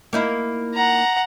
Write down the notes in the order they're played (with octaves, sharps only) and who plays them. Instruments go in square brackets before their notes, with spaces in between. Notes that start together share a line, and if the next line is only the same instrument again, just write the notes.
[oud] A#3 D#4 E4
[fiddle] F#5 A#5